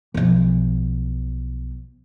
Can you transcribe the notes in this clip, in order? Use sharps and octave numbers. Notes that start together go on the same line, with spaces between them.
B1 F3